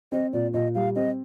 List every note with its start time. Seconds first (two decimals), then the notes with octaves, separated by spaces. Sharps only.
0.12 C4 D#5
0.33 A#2 D5
0.54 A#2 D#5
0.75 G3 F5
0.96 C4 D#5